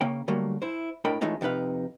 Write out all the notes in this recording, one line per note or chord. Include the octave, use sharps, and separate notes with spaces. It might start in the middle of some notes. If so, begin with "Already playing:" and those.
C#3 A#3 C#4 G5
D3 F#3 G3 A3 A#3
E4 C5
A2 D4 A#4 D#5 G5 B5
E3 G#3 A3 C#4 D#4 F4
F2 C3 D#4 B4 F5